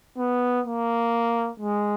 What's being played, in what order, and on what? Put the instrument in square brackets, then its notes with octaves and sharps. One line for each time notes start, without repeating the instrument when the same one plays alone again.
[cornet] B3
A#3
G#3